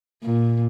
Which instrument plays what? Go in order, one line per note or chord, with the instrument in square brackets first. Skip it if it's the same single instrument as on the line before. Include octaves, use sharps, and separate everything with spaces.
[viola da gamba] A#2